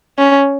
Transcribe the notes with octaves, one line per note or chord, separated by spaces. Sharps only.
C#4